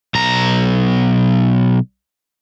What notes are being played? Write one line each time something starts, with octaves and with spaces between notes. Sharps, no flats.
B1 A#5